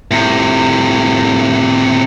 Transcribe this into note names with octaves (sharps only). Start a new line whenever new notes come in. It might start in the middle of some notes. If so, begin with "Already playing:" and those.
A2 C3